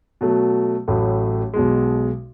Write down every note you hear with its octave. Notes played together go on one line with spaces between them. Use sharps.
B2 F#3 A3
A1 A2 F#3 A3
B1 B2 G#3